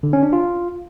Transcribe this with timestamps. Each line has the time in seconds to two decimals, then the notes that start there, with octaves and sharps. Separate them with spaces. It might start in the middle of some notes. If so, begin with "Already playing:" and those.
0.03 D3
0.13 C#4
0.23 D4
0.33 F4